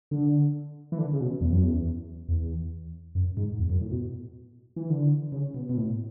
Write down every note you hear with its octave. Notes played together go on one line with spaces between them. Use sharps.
D3
E3
D3
C#3
B2
E2
F#2
E2
E2
F#2
G#2
E2
F#2
A2
B2
E3
D3
C#3
B2
B2
A2